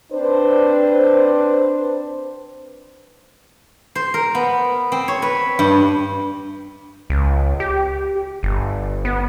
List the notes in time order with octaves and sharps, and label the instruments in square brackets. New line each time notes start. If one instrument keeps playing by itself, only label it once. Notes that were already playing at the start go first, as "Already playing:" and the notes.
[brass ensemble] C4 D4 B4 C5
[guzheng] C5
A#4
B3
C4
C#5
B4
G2
[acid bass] C#2
G4
G1
B3